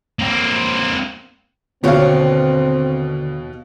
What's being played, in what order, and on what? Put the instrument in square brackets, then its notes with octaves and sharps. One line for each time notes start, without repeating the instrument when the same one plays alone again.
[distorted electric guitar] A#3 C4
[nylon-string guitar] D#2 C#5 G5 [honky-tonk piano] B2 F#4 F5 [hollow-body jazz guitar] D3 [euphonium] C4